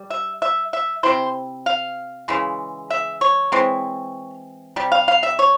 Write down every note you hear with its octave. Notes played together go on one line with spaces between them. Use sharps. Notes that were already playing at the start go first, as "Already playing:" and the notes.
Already playing: G3
E5
E5
E5
C3 G3 C4 E4 C5
F5
C#3 E3 G#3
E5
C#5
E3 G#3 C4
C3 G3
F5
F5
E5
C#5